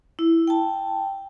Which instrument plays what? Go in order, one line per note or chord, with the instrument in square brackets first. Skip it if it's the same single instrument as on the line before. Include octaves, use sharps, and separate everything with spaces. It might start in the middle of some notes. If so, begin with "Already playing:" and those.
[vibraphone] E4
G5 A5